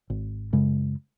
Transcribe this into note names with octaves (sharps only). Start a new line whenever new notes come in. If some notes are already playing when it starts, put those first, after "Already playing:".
G#1
F#2 C#3 G#3